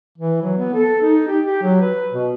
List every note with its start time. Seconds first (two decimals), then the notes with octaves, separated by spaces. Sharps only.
0.18 E3
0.42 F#3
0.57 B3
0.74 A4
1.02 D#4
1.28 G4
1.45 G4
1.62 F#3
1.81 B4
2.13 B2